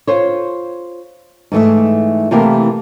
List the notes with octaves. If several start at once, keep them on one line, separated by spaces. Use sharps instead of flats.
F4 C5 C#5
G#2 E3 A3 E5
C3 E3 A3 A#3 G4 A#4